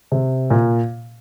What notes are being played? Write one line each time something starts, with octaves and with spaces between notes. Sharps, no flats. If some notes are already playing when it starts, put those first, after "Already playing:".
C3
A#2